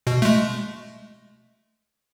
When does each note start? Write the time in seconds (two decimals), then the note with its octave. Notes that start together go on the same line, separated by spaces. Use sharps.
0.07 B2
0.22 G#3 A3